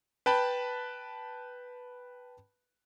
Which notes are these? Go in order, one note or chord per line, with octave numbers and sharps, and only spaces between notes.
B4 G5 A5 B5